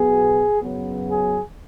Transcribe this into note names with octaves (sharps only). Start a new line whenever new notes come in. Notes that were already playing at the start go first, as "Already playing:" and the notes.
Already playing: B1 B2 B3 G#4
F#2 C#3 F#3 B3
G#4